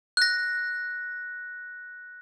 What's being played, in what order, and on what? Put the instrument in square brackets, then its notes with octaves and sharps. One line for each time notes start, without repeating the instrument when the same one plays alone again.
[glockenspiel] F#6 A#6